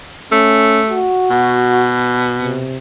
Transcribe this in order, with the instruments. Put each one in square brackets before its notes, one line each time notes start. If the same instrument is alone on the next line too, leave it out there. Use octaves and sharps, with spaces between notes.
[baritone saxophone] A3 [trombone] C#4
[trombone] F#4
[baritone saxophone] B2
[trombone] C3